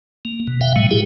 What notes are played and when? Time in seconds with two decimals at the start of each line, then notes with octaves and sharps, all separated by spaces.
0.25 A#3
0.47 B2
0.61 B2 E5 F5 G5
0.76 A2 F#3 G#3
0.91 E4 G4 G#4